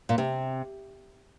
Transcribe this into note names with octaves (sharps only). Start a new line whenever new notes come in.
A#2
C3